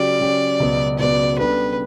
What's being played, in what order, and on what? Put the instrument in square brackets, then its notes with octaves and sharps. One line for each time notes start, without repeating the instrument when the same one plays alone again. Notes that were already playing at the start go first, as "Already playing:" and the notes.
Already playing: [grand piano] C#3 F#3 C#4 G4 [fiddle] D5
[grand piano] C#3 F#3 C#4 G4
C#2 B2 F#3 B3
[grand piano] C#2 B2 F#3 B3 [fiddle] D5
[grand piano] C#3 G3 B3 D4 A4 [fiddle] B4